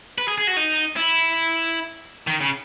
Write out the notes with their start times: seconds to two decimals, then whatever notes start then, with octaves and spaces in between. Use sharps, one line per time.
0.18 B4
0.28 G#4
0.38 G#4
0.47 F#4
0.57 D#4
0.96 E4
2.27 D#3
2.41 C#3